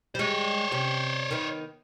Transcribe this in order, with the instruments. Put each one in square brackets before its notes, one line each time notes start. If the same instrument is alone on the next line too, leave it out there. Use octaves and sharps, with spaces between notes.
[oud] G3 G#3 [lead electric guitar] C5 C#5
[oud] C3 C#4 G4
D#3 B3